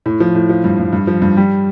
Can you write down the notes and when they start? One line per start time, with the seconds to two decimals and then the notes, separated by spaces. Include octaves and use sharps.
0.06 A2
0.20 F3
0.35 A2
0.49 F3
0.64 G2
0.79 G2
0.93 G2
1.07 F3
1.22 G2
1.37 G3